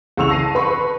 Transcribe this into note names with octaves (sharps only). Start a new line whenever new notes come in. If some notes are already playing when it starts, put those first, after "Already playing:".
C2 C#3 C#6 E6 F7
A5 A#6 C7 D#7
B4 B5 C#6